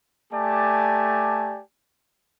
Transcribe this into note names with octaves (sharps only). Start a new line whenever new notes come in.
A3 G4 D5 G#5 A5